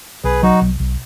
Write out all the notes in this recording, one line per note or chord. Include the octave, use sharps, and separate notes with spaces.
B1 G#4 B4
F#3 D#4 F#4
B1
B1